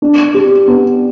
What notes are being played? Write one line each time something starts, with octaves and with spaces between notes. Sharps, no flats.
D4
G4
B3